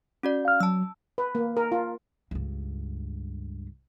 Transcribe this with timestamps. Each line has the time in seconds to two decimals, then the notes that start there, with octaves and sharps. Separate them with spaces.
0.23 C#4 F#4 D5
0.45 F5 F6
0.60 F#3 A5 E6
1.18 B4
1.35 A#3
1.57 A#4
1.72 F4
2.31 C#2 G2